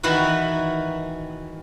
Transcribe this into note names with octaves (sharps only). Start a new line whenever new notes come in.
D#3 E3 E4 F#4 B4